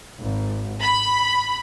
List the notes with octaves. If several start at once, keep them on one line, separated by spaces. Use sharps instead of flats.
G#1
B5